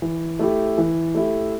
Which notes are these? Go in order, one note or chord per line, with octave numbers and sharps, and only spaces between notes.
E3
A3 E4 G4
E3
A3 E4 G4